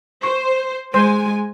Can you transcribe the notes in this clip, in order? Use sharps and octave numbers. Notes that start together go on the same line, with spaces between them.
C5 C#6
G#3 C5 G#5